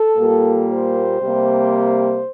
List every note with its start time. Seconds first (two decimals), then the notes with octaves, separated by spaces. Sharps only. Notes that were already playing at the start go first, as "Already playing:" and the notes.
Already playing: A4
0.18 A#2 G3 A#3
0.69 C5
1.21 C3 G3 A#3